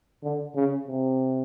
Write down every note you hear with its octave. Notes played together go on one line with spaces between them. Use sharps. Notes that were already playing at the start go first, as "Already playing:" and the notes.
D3
C#3
C3